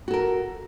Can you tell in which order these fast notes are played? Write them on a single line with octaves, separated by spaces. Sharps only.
F#4 A4 A#4